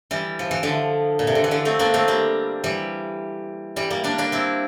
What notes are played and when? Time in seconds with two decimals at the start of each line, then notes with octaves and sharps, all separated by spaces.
0.11 E3 G3
0.39 F3
0.51 E3
0.63 D3 F3
1.19 A#2
1.27 C3
1.35 D3
1.44 E3
1.51 D3 F3
1.65 A3 C4
1.79 A#3 D4
1.94 A3 C4
2.08 G3 A#3
2.64 E3 G3
3.76 E3 G3
3.90 G3 A#3
4.04 A#3 D4
4.18 A#3 D4
4.32 C4 E4